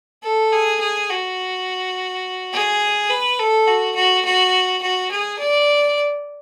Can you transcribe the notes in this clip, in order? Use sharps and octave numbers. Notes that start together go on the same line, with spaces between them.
A4
G#4
G#4
F#4
G#4
B4
A4
F#4
F#4
F#4
F#4
G#4
D5